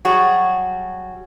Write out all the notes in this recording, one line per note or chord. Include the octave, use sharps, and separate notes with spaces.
F#3 G3 F#4 G#4